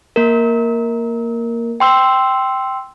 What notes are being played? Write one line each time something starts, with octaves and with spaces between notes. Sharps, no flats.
A#3 A#4
G5 C6 E6